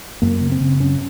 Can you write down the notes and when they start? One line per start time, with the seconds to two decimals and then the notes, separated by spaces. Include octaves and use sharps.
0.22 F#2 A#3
0.41 C#3
0.52 C4
0.61 C#3
0.80 F#2 C#4